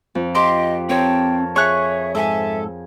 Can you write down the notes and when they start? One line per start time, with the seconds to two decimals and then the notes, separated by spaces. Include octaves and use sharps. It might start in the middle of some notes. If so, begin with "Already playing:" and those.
0.15 F2
0.35 G4 D#5 C6
0.89 C4 A#4 C#5 G5 A5
1.56 G#4 C#5 E5 C#6 F#6
2.15 G#2 A4 E5 G#5